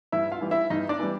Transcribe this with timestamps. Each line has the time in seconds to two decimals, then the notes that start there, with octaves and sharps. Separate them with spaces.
0.12 G2 E4 E5
0.32 F4 F5
0.41 E3 G3
0.51 E4 E5
0.70 G2 D#4 D#5
0.89 D4 D5
1.00 E3 G3